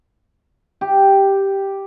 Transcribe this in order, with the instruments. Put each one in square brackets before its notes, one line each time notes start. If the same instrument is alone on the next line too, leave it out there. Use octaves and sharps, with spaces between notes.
[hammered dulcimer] G4